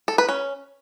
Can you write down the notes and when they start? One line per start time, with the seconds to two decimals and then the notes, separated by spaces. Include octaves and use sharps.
0.08 A4
0.18 B4
0.29 C#4